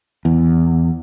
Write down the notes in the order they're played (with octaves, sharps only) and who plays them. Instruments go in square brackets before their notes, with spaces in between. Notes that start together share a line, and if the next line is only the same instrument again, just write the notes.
[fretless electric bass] E2